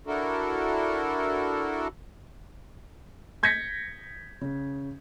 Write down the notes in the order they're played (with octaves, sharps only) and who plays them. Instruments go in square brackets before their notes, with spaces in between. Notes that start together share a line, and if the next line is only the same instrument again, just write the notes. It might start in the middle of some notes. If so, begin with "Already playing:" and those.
[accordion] D4 E4 F#4 A4 A#4
[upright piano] G6 G#6 A#6 B6 C#7
C#3